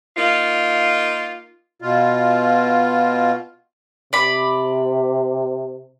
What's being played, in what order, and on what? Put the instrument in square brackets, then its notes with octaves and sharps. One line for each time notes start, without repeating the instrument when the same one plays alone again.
[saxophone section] A#3 D#4 F4
[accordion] B2 F4
[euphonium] C3 [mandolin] D5 B5